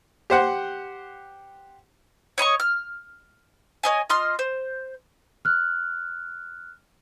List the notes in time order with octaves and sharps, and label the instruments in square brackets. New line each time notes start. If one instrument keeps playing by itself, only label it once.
[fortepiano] G4 C5 F#5
[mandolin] C#5 D#5 C6 C#6
F6
C#5 D#5 G#5
F4 D#5 C6 F6
C5
[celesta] F6 F#6